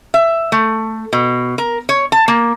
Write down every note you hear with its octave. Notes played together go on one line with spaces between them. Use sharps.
E5
A3
B2
A#4
C#5
A5
A#3